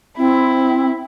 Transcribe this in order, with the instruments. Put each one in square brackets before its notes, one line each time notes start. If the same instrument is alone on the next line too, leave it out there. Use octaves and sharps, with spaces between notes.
[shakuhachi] C4 [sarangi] E4